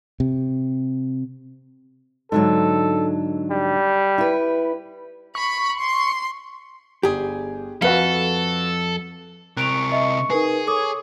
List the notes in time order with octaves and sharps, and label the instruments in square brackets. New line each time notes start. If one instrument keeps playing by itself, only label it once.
[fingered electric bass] C3
[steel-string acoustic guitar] G#2 D3 F#3 [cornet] A4
[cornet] G3
[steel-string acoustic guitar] E4 B4
[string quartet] B5 [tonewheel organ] C#6
[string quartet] C6
[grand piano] G1 [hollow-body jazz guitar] G4 G#4
[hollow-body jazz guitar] F2 [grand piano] F#4 B4 F5 [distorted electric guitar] A4
[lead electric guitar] C3 A#4 [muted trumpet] C#6 [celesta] F#6 D7 F7
[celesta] D#5 E5
[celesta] D#4 A#4 B4 [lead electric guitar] G#4
[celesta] A4 D6 D#6 [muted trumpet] C#5